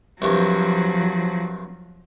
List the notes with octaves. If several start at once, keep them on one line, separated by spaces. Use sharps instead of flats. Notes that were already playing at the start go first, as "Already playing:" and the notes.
C2 G2 F3 F#3